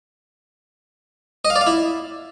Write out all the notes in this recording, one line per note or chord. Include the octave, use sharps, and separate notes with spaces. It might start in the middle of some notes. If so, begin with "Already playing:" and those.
D#5
F5
D5
F5
E4